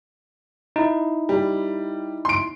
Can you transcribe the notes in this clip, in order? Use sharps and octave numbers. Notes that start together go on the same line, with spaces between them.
D#4 E4
G3
C6 D7